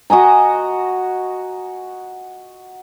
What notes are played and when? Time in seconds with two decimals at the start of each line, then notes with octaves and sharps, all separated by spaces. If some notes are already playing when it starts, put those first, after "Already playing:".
0.10 F#4 D#5 G#5 A#5